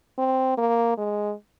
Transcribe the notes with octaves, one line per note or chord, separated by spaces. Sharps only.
C4
A#3
G#3